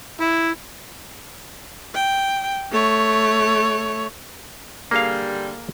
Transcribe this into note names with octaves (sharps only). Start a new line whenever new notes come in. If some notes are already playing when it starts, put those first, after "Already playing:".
E4
G5
A3 C#5
D3 G3 A#3 G#4 F5